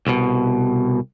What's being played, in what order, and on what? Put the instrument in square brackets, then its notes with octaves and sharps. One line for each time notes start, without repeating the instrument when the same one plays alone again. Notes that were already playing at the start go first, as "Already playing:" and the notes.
[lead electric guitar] C2 B2